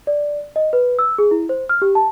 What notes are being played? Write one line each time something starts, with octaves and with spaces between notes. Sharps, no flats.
D5
D#5
B4
E6
G#4
E4
C5
F6
G4
A5